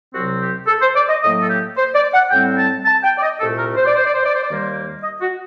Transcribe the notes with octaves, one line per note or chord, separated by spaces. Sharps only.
C2 C3 F#3 C4 F#4
G4
A4
C5
D5
D#5
A2 F#3 A#3 D#5
A4
G4
C5
D5
F#5
A2 G3 C4 G5
A5
A5
G5
D5
D#5
C2 A#2 A3 A4
A#4
C5
D5
C5
D5
C5
D5
C5
D5
D#2 D#3 G3 A#3 C5
D#5
F#4